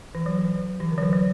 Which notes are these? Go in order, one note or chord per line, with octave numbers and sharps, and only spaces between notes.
E3
F#3
E3
E3
D3
F#3
E3
F#3